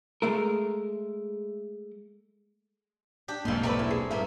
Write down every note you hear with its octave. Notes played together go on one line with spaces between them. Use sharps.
G#3 A3 A#4
D4 G4
E1 B1 F2 G#2 A#3 C6
A3 C4 A#4 B4 D5
E4
G#4
G2 A#3 B3 E4